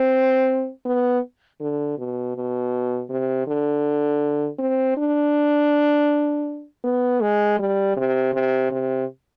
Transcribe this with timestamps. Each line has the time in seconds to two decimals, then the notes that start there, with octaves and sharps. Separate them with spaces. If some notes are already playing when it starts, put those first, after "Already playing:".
Already playing: C4
0.85 B3
1.60 D3
1.98 B2
2.36 B2
3.10 C3
3.47 D3
4.59 C4
4.97 D4
6.84 B3
7.21 G#3
7.59 G3
7.97 C3
8.34 C3
8.71 C3